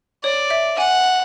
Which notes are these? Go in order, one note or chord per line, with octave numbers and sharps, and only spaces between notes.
C#5 D5
E5
F#5 G#5